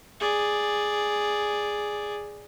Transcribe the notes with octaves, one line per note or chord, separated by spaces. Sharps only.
G#4 D5